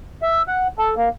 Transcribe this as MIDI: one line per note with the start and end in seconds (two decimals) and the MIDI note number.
0.22 0.42 76
0.48 0.67 78
0.79 0.94 69
0.97 1.09 58